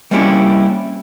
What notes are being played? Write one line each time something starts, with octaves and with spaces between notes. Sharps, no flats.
G3 A#3 C4 C#4 E4 G4